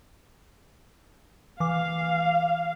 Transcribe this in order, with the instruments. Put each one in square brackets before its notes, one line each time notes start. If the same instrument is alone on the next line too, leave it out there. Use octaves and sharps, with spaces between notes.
[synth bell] E3 D6 [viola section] F5